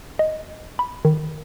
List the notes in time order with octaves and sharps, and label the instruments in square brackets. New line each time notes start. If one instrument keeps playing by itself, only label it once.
[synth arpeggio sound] D#5
B5
D#3